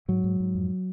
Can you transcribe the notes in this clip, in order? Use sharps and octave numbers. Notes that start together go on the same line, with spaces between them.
G#2 F#3
G#2
G#2
F2